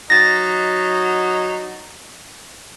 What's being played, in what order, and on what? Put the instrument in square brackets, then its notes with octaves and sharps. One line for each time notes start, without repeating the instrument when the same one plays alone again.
[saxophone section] F#3 D#4 [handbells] A6 A#6